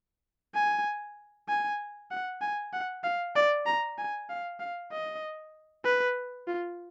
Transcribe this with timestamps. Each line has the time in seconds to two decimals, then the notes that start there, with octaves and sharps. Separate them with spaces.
0.54 G#5
1.49 G#5
2.11 F#5
2.41 G#5
2.73 F#5
3.04 F5
3.35 D5
3.66 A#5
3.98 G#5
4.30 F5
4.60 F5
4.92 D#5
5.85 B4
6.47 F4